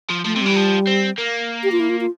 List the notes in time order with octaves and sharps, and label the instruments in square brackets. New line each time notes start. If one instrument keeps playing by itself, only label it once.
[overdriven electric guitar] F3
[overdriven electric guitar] F3 [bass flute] A3
[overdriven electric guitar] C3
[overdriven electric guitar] E3 [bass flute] G3
[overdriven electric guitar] F3
C4
A#3
[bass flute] G4
F4
E4
F4
F4